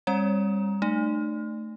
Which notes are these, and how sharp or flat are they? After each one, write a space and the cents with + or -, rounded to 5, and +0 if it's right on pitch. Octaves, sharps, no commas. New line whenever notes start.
G3 +35 C4 +45 C#5 +40
A3 +0 D#4 -45